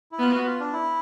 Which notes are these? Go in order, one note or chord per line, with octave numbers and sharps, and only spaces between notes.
E4
B3 F4
F#4
F4
D4
E4